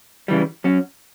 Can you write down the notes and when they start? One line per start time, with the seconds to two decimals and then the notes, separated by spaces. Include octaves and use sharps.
0.28 C#3 E3 G3
0.64 F#3 C#4 F#4